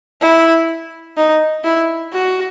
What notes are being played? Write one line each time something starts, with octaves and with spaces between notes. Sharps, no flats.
E4
D#4
E4
F#4